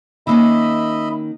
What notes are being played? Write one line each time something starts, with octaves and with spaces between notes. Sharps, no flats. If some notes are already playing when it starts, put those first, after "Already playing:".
D#3 A#3 C#4 D#5 E5 B5